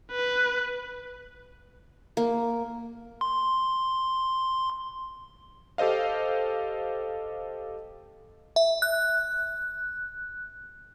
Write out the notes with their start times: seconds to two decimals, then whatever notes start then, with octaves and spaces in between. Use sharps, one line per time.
0.11 B4
2.17 A#3
3.21 C6
5.78 G4 A4 C5 D#5 F5
8.56 E5
8.82 F#6